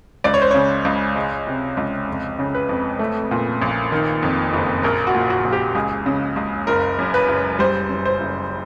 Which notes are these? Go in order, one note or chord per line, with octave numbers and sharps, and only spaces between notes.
C#2 D5
C#5
C5
C#3 C#5
C#2
G#3
C3
C#2
F2
C#3
B4
F2
A3
A#2
A#1
D#3
F2
F#1
A#1 A#4
F#4
A#2
F#4
A#1
G4
C#2 G#4
C#3
C#2
F#1 A#4
F#2
B4
F#1
G3 C5
F#2
C5
F#1